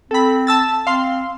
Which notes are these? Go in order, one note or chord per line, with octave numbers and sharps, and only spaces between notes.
C4 A4 B5
A5 E6 A6
C4 F5 C6